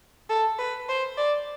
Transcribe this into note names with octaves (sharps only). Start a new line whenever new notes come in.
A4
B4
C5
D5